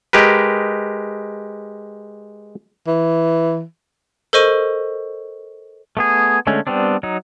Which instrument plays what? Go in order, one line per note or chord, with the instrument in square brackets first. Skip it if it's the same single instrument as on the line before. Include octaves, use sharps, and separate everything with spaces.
[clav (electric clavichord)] G#3 G4 A#4 B4
[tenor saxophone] E3
[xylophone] A4 A#4 C5 D#5 C#6 D#7
[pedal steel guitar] A3 B3 G#4
D3 G#3 A3 C#4
G3 B3 C4 D4
F#3 D#4